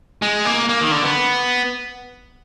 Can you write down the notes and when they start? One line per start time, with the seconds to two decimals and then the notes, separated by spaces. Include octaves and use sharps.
0.22 G#3
0.45 A#3
0.69 A#3
0.81 D#3
0.91 D3
1.04 B3